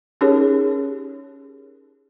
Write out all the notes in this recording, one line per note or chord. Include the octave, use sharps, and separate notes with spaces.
C#4 D#4 G4 G#4 A#4 C#5